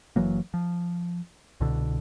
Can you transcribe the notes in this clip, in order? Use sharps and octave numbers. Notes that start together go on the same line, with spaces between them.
F#1 E3 F#3 A#3
F3
C2 B2 D3